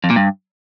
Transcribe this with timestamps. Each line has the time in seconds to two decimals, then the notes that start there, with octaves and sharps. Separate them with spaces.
0.04 F2
0.10 A#2
0.16 G2